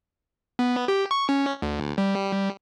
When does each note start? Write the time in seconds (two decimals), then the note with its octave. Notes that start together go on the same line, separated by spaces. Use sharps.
0.59 B3
0.88 G4
1.11 C#6
1.29 C#4
1.62 D2
1.98 G3